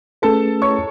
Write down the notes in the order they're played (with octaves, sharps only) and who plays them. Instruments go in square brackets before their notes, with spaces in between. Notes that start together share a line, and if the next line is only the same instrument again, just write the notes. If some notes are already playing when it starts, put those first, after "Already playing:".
[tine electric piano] A3 C#4 G#4 B4 [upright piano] A4 A5
[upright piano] C#5 C#6